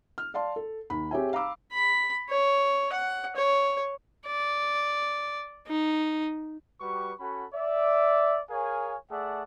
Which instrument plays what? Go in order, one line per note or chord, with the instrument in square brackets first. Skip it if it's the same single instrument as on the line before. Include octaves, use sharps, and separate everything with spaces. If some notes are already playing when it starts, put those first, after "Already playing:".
[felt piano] F6
D5 F5 A5 C6
A4
D#2 B5
C4 G4 G#4 C#5 E5 G#5
F5 A#5 B5 D6 E6
[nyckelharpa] B5
C#5
F#5
C#5
D5
D#4
[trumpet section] G3 F#4 G4 B4 C#6
C#4 F#4 A4 F#5 B5
D5 E5
G#4 A#4 C#5 F5 G#5
A3 G#4 D5 E5 F#5 A5